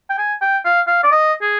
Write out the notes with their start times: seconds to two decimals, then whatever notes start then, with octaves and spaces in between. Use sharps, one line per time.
0.10 G5
0.18 G#5
0.41 G5
0.65 F5
0.87 F5
1.04 D5
1.12 D#5
1.42 G#4